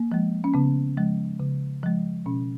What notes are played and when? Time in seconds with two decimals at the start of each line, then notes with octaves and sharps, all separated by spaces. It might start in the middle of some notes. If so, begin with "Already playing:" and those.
Already playing: A#3
0.12 F3 G#3
0.44 C#4
0.54 C#3 B3
0.97 F3 G#3
1.39 C#3
1.83 F3 G#3
2.26 B2 C#4